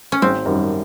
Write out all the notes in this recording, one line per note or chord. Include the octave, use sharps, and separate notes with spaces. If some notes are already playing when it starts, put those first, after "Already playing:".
C#4
G#1 C4
F#2 D#3 G3